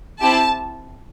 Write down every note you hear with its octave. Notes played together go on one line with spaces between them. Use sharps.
C4 E4 G4 A5